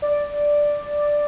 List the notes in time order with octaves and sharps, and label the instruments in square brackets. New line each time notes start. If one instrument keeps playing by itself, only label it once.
[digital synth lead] D5